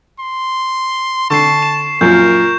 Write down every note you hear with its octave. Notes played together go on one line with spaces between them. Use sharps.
C6
D3 A5 C#6 C7
E7
F#2 A#2 F3 A#4 G6